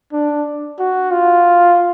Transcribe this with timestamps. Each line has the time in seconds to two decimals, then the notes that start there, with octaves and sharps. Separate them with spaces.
0.12 D4
0.79 F#4
1.11 F4